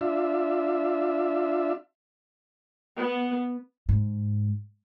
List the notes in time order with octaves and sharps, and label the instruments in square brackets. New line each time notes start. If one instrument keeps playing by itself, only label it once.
[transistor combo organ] D4 F4 E5
[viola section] B3
[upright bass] G#2